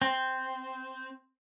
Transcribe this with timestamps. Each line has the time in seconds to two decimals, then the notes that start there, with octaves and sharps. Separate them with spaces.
0.02 C4